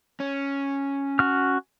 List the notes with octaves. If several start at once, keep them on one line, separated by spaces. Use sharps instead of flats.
C#4
F#4 F6